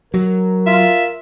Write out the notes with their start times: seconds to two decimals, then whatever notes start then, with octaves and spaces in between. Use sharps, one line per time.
0.14 F#3 A#4
0.67 F4 E5